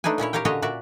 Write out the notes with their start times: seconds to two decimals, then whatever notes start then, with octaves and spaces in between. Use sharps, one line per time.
0.04 A3 D4 D#4 B4 G#5
0.18 A#2 C#4 E4 C#5
0.33 G4 A#4 C#5 F5 G5
0.45 D3 C#4 F4 F#4 C#5 D#5
0.62 A#2 F#4 D5 E5